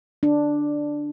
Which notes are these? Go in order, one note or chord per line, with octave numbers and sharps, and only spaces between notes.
D4